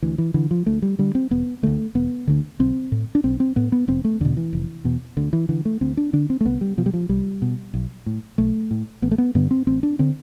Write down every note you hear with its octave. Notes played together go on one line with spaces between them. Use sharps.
D2 E3
E3
D3 E3
F3
D2 A3
G3
D3 G3
C4
E1 B3
D2 D3 A3
E1 B3
D2 D3
B1 C4
A2
D4
B1 C4
C4
A2 B3
B3
F1 C4
A3
E2 B2 D3
E3
F1
E2 B2
D2 D3
E3
D3 E3
A3
D2 C4
D4
D3 D4
C4
A3
C2 B3
G3
B2 F3
G3
F3
C2 G3
B2
B1
A2
B1 A3
A2
A1 B3
A3
B3
G2 D3 B3
C4
A1 C4
D4
D3 C4